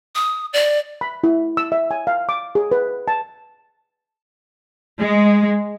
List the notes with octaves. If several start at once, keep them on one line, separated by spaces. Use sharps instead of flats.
D#6
D5
B5
E4
E6
E5
G#5
F5
D6
G#4
B4
A5
G#3